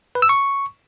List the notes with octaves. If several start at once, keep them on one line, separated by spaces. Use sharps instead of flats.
B4
E6
C#6